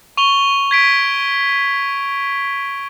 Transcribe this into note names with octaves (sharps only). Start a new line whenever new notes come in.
C#6 F7 G7
G#6 B6 D7